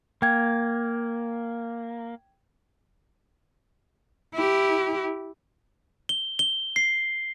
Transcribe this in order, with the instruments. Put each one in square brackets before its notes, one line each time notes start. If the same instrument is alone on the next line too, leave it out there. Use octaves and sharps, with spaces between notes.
[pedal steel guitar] A#3 [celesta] G5 G#6
[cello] E4 G4
[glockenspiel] G7
G7
C7